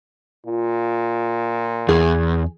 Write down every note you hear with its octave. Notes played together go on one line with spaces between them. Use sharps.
A#2 F4
E2 G#4